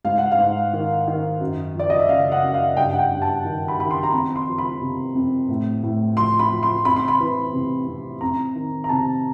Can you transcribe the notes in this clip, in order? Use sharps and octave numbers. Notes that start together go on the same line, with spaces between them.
G#2 F5
F#5
F5
G#2
D#3
D#3
F#2
F3
D5
D#5
E5
C#3 F5
F#5
F#2
F5
G2 G5
F#5
G5
G2
A5
D#3
B5
D#3 B5
C6
A#5
F2 B5
C6
F3
B5
C3
F2
A2
A2
F3 C6
B5
F3
C6
F2 B5
C6
B5
E3
C3
F2
F2 A#5
D#3
A#5
C3 A5